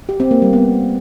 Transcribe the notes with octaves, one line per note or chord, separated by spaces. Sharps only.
G4
C4
A#3
G3
B3